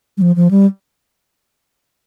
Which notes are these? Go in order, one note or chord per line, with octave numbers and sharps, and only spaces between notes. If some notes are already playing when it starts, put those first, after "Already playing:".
G3
F3
F3
G3